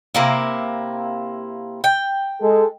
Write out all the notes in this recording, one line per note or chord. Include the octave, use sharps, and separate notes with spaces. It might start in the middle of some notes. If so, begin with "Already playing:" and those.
C3 A#3 E4
G5
G#3 A4